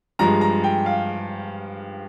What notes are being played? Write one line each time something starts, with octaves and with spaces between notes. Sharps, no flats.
G2 F3 G#3 A#5
A#5
G5
F5